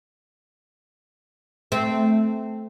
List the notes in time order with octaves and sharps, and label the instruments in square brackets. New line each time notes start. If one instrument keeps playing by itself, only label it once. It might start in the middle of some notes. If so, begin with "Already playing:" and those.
[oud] A3 C4